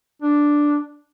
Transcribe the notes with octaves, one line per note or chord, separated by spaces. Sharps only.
D4